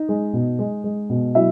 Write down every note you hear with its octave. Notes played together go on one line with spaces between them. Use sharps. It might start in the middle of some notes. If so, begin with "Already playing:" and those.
Already playing: D#4 D#5
G#3
B2
G#3
G#3
B2
F#3 E4 E5